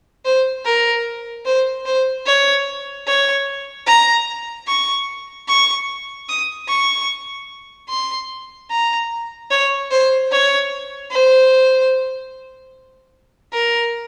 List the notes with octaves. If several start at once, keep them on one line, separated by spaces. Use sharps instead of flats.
C5
A#4
C5
C5
C#5
C#5
A#5
C#6
C#6
D#6
C#6
C6
A#5
C#5
C5
C#5
C5
A#4